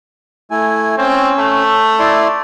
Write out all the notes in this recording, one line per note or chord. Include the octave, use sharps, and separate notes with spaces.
A3 E4 G#5
C4 C#4
A3
E4 D5 C6